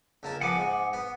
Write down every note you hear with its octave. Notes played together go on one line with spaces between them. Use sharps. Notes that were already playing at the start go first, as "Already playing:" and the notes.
C#2 A#3 A5
F2 B3 F#5 G#5 D6
G#2
B3